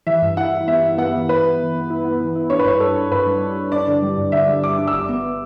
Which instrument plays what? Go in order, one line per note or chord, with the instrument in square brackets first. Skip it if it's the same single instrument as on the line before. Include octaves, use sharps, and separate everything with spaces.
[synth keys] E3 [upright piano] E5
[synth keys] G2
[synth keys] E4 [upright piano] F#5
[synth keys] E4
[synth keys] B3 [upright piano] E5
[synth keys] E4
[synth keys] B3 [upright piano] F#5
[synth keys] E3
[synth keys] E3 [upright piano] B4
[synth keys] B3
E3
B3
E4
B3
E3
E4
[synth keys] D4 [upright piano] C#5
[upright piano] B4
[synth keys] G2 [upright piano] C#5
[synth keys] G2 [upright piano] A4
[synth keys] G2
[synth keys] G2 [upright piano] B4
[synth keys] G3
D4
D4
[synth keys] D4 [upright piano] D5
[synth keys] D3
G3
G2
[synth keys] D3 [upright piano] E5
[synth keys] G3
[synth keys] G2 [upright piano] D6
[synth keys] D4
[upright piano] E6
[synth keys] G1 [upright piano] D6
[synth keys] B3